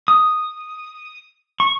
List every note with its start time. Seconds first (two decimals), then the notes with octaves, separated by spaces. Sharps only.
0.08 D#6
1.60 C#6